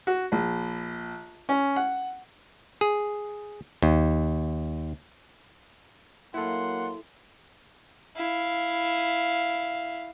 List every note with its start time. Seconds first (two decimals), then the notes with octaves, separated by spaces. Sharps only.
0.07 F#4
0.32 A#1
1.49 C#4
1.76 F#5
2.81 G#4
3.82 D#2
6.34 F#3 A#3 E4 A4 F#5 C6
8.16 E4 F5